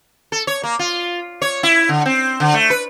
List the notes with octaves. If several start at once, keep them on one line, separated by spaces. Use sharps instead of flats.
A4
C#5
A#3
F4
C#5
E4
D3
C4
D3
A3
B4